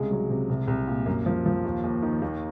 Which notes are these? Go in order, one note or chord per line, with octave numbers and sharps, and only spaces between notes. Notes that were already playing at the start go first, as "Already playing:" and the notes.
Already playing: C2 C#3 G#3
F#3
C3
C2
C2
A#2
F#2 A#3
F3
F3
D#2
D#2
D#3
D#2